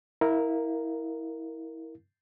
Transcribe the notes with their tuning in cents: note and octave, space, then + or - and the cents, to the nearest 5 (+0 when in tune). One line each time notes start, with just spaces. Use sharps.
E4 -20 A#4 +0 F5 +0